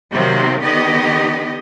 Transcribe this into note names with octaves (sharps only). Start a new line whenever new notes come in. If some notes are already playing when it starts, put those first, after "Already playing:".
C3 D#3 F#3 A#3 C4
D3 D#3 B3 G4 D#5